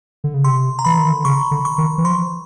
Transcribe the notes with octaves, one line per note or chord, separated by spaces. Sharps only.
D3
C#3
C3 C6
A#5
E3 B5
D#3
D3
C#3 C#6
D3
C#6
D#3
E3
F3 C6